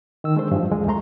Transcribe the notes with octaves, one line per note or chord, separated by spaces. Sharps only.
D#3 E6
G#3 A3 D4 C5
G2 E3 F3
D2 F3 G#3
E2 G#3 A3 A#5 C6